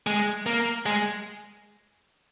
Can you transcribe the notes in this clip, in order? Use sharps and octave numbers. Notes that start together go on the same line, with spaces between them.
G#3
A#3
G#3